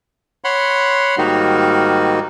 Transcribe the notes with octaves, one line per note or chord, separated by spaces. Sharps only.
C#5 F#5 B5 C6
G#2 D#3 G3 A#3 D#4 F#4